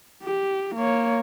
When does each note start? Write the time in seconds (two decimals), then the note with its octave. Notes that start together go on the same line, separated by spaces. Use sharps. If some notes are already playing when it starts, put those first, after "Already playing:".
0.24 G4
0.75 A#3 C#5